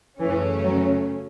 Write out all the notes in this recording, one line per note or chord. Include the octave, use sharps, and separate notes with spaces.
F#2 C#3 E3 A3 C#4
F#3